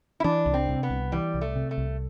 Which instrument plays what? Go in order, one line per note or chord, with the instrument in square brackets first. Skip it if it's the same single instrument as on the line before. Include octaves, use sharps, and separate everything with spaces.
[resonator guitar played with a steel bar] E4
[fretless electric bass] E3 [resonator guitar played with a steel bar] D4
[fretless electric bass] C2
[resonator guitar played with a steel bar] C4
[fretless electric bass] C3
[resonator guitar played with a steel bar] B3
[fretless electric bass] C2
[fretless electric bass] E3 [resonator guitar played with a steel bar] G3
[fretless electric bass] C2
[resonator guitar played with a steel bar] A3
[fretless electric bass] C3
[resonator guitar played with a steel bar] A3
[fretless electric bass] C2